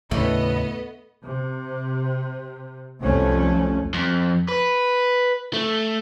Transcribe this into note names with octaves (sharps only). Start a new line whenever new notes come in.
D#2 A2 C#3 A3 B3 D4 D#5
C3
C2 F2 A3 C#4
F2
B4
A3